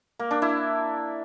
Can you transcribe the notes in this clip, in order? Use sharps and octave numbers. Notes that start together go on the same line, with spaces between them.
A#3
D4
E4